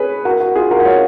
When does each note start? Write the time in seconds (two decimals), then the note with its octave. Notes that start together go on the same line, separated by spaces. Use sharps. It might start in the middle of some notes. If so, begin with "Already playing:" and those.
Already playing: G#4 B4 C#5
0.25 F#4 A#4
0.40 F#4
0.56 F4 G#4
0.71 F#4 A#4
0.80 F#5
0.86 C#5 F5